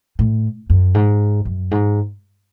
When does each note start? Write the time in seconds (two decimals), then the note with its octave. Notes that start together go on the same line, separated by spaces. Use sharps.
0.19 A2
0.70 F#2
0.95 G#2
1.45 F#2
1.71 G#2